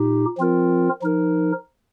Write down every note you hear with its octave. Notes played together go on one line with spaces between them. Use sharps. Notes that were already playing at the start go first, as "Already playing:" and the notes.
Already playing: A#2 D#4 G4
F3 C4 F4 A#4
F3 D#4 A#4